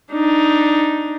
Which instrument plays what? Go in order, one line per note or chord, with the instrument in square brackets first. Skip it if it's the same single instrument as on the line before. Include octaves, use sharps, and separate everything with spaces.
[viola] D4 D#4